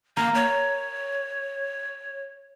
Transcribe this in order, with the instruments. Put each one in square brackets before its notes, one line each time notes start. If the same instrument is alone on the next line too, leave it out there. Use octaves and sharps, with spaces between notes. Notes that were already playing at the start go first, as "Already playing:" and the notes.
[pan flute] A#3 [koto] A#4
[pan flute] C#5